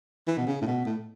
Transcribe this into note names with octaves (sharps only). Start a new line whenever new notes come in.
E3
B2
C#3
A2
B2
A2